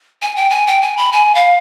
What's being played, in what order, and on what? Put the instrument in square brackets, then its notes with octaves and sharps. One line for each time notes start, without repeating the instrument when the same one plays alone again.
[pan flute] G#5
G5
G#5
G5
G#5
B5
G#5
F5